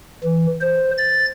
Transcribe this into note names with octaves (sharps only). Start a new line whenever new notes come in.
E3
C5
A6